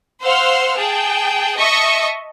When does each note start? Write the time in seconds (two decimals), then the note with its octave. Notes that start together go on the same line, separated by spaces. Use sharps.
0.23 C5 F5 F#5 C6 E6 F6
0.77 G#4 G5 A5
1.57 D#5 E5 A5 C#6 D#6